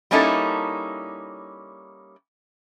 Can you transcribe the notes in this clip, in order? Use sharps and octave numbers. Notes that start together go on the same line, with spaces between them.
G3 A#3 C#4 D#4 E4 A4